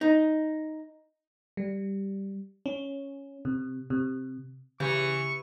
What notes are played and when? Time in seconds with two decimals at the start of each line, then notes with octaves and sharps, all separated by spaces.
0.01 D#4
1.57 G3
2.66 C#4
3.45 C3
3.90 C3
4.80 C#3 E3 G4 C#6